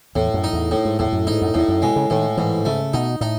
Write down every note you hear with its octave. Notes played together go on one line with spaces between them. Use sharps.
E2 A2
F#2
D#4
E2
A2
G#2
E2 A2
F#2
G#2 D#4
F#2
E2 A2
F#2
B2 G#3
C#3
A2 D#3
G#2 E3
C#3 A3
B2 D#4
A2 D#4